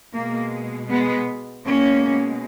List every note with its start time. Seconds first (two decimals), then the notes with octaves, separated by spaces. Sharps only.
0.15 B2 G#3 A#3
0.90 G#3 B3
1.65 B2 G#3 A#3 C#4